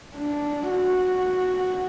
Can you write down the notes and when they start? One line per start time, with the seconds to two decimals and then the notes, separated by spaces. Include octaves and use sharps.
0.17 D4
0.70 F#4